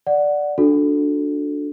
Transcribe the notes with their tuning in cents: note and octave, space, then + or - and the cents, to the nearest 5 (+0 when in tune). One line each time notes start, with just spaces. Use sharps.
D5 +0 F#5 +0
D4 +0 F#4 -30 A4 +0